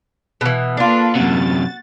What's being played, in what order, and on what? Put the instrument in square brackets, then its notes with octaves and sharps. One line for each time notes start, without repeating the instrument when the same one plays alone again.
[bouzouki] B2 E3
[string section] A#3 A4 B4 [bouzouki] D4 F4
[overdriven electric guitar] F#2 C3 [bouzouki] F#4 [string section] A6